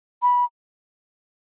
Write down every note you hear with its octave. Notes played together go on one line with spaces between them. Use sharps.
B5